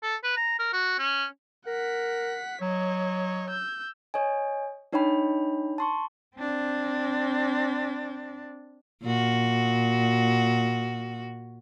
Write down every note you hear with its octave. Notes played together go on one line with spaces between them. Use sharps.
A4
B4
A#5
A#4
F#4
C#4
A#4 F#5 B6
F#3 C#5 D#5
E6 G6
C#5 D#5 G#5
D4 D#4 C#5 D#5 G5 B5
A5 C6 C#6
C4 D4
A#2 F#4